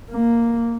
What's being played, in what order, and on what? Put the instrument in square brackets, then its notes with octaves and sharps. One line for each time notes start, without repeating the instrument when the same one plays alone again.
[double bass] A#3